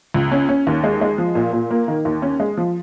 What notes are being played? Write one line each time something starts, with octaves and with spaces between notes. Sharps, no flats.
C#2
C#4
C#4
D#2
G#3
G#3
F3
A#2
A#2
A#3
D#3
D#2
C#4
G#3
F3